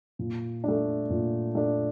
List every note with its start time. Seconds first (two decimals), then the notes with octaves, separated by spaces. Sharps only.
0.19 A#2
0.64 A3 D4
1.10 A#2
1.55 A3 D4